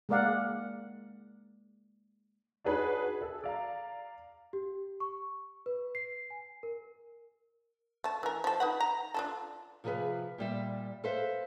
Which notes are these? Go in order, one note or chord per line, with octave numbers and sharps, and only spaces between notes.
G#3 A#3 A#4 D5 F5 F#5
D4 D#4 F#4 G#4 B4 C#5
G#4 A4
D5 F5 A#5
G4
C#6
B4
C7
G#5
A#4
A3 A5
E3 A#4
F3 A4
D#4 B4 F#5
A#5
D4 F4 A4
C3 F3 G#4 A4 B4 F5
A#2 G3 E5
A4 B4 C5 E5 F5